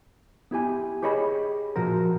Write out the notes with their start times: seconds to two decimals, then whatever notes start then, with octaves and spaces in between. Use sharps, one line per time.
0.51 B3 E4 G4 G#5
1.02 G4 G#4 C#5 D#5 A#5 B5
1.76 A#2 F3 F#4 A#4